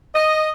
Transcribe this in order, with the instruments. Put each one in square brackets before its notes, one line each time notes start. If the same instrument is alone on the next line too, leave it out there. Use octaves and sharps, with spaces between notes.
[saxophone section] D#5